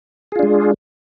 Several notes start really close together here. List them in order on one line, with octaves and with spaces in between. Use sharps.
G#4 F4 D4 G#3